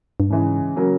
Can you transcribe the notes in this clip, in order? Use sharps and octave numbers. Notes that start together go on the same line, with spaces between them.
G2
G#2 C#3 E3 G#3
C#3 F#3 A#3